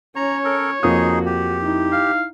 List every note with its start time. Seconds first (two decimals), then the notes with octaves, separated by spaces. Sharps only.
0.16 C#4 C#5 A#5
0.45 A4 A#4
0.83 F2 A#3 D#4 F#4 G#4 D#6
1.26 G4
1.62 D#4 E4
1.92 F5